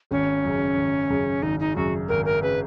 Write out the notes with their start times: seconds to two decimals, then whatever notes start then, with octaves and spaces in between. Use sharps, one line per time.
0.11 G#1 C#4
0.44 F#2 C#3
0.78 G#1
1.10 F#2 C#3
1.42 G#1 D#4
1.60 D#4
1.76 F#2 C#3 F#4
2.09 G#1 A#4
2.25 A#4
2.42 C#3 B4